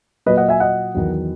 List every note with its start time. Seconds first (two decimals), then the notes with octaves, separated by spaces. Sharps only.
0.26 A#2 F#3 B4 D#5
0.37 D#5 F#5
0.49 E5 G#5
0.60 D#5 F#5
0.95 E2 D#3 F#3